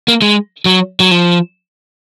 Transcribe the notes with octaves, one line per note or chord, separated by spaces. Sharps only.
A#3
G#3
F#3
F#3
F3